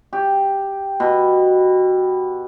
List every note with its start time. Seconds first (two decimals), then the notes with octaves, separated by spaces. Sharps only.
0.13 G4
1.00 B2